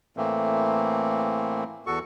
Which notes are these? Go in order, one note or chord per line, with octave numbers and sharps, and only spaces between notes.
A2 E3 A3 A#3 C4
E2 F#4 A4 C#6